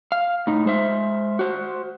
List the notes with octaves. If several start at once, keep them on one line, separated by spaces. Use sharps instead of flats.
F5
A2 D#4
G#3 C5 E5
F#4 C5